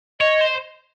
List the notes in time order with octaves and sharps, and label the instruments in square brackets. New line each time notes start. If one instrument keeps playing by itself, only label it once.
[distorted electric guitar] C#5 [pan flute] D#5
[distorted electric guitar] C5